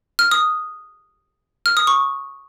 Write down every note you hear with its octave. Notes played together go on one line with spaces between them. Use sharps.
F6
D#6
F6
D#6
C#6